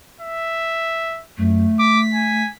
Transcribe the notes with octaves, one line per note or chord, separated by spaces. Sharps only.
E5
F#2 A3
D6 B6
G#5